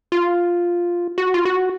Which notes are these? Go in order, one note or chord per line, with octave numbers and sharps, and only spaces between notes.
F4
F#4
F4
F#4